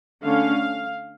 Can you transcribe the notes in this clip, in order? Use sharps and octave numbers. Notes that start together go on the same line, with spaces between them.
D3 A3 C#4 F5